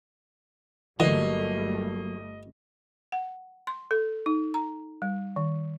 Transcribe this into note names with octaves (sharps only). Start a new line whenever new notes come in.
G1 D3 E3 F#3 G3 A3 A#3 D#5
F#5
C6
A4
D#4
A#5
G3
D#3